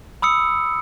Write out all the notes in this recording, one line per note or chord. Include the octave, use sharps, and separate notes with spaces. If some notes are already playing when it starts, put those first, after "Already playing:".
B5 D#6 E6 C#7